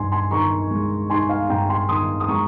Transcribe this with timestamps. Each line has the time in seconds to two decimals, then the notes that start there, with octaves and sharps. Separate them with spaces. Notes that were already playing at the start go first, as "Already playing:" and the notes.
Already playing: G2 D#4 G#5 C6
0.12 G#5 C6
0.31 D#3 A#5 C#6
0.71 G#3
1.10 D#4 G#5 C6
1.29 F5 G#5
1.49 G2 G5 A#5
1.69 G#5 C6
1.89 D#3 C6 D#6
2.20 D#6
2.28 G#3 A#5 C#6